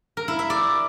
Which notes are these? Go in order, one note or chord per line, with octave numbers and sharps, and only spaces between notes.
A#4
E4
E5
D5